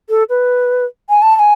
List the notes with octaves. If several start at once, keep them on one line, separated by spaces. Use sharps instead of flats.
A4
B4
G#5
A5
A5
G#5